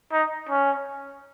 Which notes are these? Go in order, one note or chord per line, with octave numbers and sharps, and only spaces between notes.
D#4
C#4